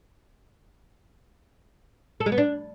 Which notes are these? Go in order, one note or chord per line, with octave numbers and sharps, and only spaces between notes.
A4
G#3
B3
D4